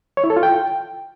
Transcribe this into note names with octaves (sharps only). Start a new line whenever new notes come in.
C#5
E4
A4
F4
G5